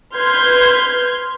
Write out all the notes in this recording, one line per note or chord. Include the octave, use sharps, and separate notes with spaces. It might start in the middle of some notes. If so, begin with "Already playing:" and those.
B4 C6 F6 G6 G#6